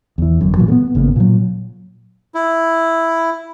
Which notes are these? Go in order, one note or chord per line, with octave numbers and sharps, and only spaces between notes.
E2 E3
G1 F#2
A#2 D#3 E3 F#3
G#3 B3
G#1 C#3 A#3 B3
A#2 F#3
E4